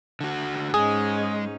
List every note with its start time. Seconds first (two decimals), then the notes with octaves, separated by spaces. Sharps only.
0.21 D3 F#4
0.74 G#2 G#3 C#4 D#4 G#4